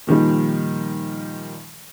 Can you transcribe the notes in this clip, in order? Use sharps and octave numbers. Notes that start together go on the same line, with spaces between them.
A#2 D#3 F3 G3